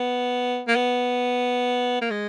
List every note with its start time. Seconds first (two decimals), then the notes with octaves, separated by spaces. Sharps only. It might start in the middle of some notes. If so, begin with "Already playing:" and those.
Already playing: B3
0.68 A#3
0.76 B3
2.02 A#3
2.11 G#3